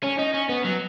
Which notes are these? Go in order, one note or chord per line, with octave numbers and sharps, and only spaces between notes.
C#4
D#4
C#4
B3
F#3